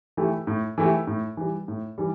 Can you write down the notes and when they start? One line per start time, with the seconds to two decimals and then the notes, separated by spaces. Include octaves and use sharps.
0.17 E3 A3 E4 G4
0.47 A2
0.78 E3 A3 E4 G4
1.07 A2
1.37 E3 G3
1.68 A2
1.98 E3 G3